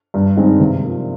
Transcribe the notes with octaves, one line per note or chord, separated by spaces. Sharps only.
G2
D#3 G#3 C4 D#4
C3
F3 A#3